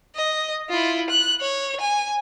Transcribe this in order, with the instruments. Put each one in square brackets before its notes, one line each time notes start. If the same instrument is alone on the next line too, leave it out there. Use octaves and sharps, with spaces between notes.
[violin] D#5
E4 F4
F#6
C#5
G#5